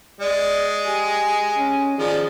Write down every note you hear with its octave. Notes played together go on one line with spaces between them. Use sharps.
G#3 D5
G4 G#5
C#4
D#3 F3 G#4 D5